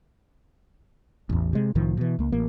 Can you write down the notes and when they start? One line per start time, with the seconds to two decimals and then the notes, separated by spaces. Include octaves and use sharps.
1.29 A1 E2
1.53 C3 G#3
1.75 C2 A2 D#3 F3
1.97 B2 E3
2.19 C#2 A#3
2.32 A1 A#3